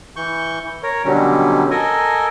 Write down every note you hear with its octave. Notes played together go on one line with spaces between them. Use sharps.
E3 C#6 G6
A#4 C#5
B2 D3 D#3 F#3 G3 C#4
A4 A#4 D#5 G#5